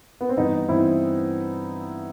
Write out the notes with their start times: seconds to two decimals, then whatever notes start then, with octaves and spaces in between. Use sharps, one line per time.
0.21 B3
0.29 C4
0.37 G2 E3 G3 B3 D#4
0.69 G2 E3 G3 C4 E4